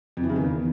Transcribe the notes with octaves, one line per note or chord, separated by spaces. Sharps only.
F2
E3
C#3
D#3
E2